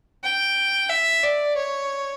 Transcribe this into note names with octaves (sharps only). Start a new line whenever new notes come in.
G5
E5
D5
C#5